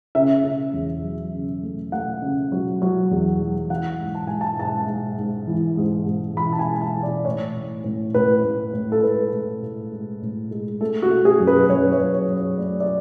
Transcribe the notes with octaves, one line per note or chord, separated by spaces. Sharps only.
C#3 E5
C#3
E2
F#3
C#3
A3
A3 F#5
C#3
F#3
F#3
E2
F#3
E3 F#5
G#2
A5
G#2 G#5
A5
G#2 A5
G#2
G#2
E3
G#2
G#2
E3 B5
A5
G#5
G#3
G#5
A5
E3
D5
A2 C#5
A2
A2
A2 B4
A2
A2
A4
G#3 B4
A2
A2
G#3
A2
G#3
A3 A4
F#4
A3
G#4
F#2
B4
B4
F#2 C#5
B4
C#5
F#2
C#5
F#2
C#5
A3 D5
D5